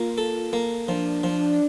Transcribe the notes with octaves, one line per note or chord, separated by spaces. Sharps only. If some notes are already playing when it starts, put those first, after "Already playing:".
Already playing: A#3 F4
A4
A#3
F3 D4
F3